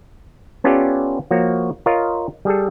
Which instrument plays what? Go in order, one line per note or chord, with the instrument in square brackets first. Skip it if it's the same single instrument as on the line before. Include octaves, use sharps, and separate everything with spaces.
[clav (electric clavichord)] B3 C#4 F4 G4 A4 D5
F3 A#3 F#4 C#5
F4 A#4 C#5 D#5 F5
G3 G#4 A4